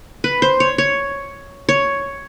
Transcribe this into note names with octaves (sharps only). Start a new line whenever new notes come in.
B4
C5
C#5
C#5
C#5